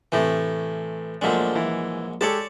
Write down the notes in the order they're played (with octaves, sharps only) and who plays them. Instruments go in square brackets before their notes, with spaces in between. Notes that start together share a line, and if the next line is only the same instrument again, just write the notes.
[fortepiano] A2 C3 [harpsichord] E3 A3
[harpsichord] A#1 F#3 G#3 [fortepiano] F3 A3 D4
[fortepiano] E3
[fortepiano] G#3 G4 A4 [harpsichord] C#5 D5 A5